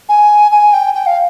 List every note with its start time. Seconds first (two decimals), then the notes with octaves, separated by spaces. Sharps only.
0.09 G#5
0.52 G#5
0.73 G5
0.94 G5
1.06 F5